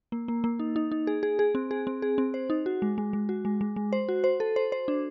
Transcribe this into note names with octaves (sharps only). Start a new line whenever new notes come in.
A#3
A#3
A#3
D#4
D#4
D#4
G#4
G#4
G#4
C4
G#4
C4
G#4
C4
C5
D#4
F#4
G#3
G#3
G#3
F#4
G#3
G#3
G#3
C5
F#4
C5
A4
C5
C5
D4